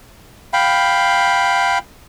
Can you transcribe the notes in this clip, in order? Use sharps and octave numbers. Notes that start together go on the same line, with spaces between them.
F5 G5 B5